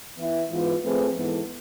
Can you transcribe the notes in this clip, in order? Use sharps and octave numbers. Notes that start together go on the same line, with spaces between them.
E3 B3 E4
G#2 E3 B3 F4 B4
F3 A3 C4 G#4 B4
G#2 E3 B3 E4 A4